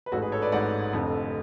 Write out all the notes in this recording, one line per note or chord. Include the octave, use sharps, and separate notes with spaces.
B4
A1 G#2 F#4 A4
G#4 B4
A4 C#5
B4 D5
A1 G#2 D5 F#5
F1 F2 D3